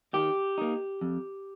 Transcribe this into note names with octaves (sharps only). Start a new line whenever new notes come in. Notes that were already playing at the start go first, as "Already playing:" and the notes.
D#3 G4
A#3 D#4
F2